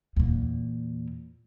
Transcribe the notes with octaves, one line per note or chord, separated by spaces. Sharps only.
E2 A#2